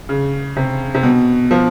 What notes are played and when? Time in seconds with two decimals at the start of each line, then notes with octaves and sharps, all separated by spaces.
0.09 C#3
0.56 C3
0.95 C3
1.03 B2
1.51 F3